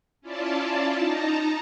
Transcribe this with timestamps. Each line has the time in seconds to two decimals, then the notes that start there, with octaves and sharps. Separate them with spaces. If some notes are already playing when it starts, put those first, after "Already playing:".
0.21 C#4 E4 F4 D5 A5
0.94 D#4 A5 A#5